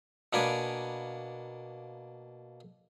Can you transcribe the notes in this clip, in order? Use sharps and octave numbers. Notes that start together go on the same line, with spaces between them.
B2 A#3 D4 B4 G#5 D6